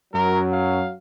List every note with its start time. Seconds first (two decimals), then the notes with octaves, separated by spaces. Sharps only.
0.14 F#2 F#3 A#4
0.52 F5